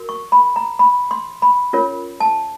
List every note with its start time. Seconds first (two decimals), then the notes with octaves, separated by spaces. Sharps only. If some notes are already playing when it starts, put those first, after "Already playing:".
Already playing: F#4 A#4
0.09 C#6
0.32 B5
0.56 A#5
0.79 B5
1.11 C6
1.42 B5
1.73 C#4 F4 A#4 C#5
2.20 A5